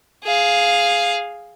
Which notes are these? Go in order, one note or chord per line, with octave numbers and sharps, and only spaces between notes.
G#4 F5